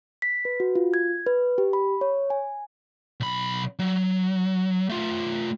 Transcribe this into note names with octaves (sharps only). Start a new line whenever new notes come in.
B6
B4
F#4
F4
G#6
B4
G4
B5
C#5
G#5
B1 B5
F#3
A3 F4